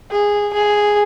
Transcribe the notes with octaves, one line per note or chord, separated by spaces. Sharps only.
G#4
G#4